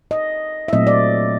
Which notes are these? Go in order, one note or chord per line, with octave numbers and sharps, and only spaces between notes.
D#5
E5
A#2 F#3 A3 C4 D#5
D5